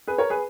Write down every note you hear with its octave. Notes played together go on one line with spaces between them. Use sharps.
G#4 B4
A#4 C#5
G#4 B4